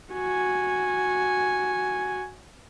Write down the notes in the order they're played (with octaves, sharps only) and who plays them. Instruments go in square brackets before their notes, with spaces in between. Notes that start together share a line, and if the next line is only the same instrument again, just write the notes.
[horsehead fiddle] F#4 G#5